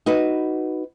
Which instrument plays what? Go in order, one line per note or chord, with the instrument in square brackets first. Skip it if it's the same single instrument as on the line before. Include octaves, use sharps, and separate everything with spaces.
[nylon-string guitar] D#4 F#4 B4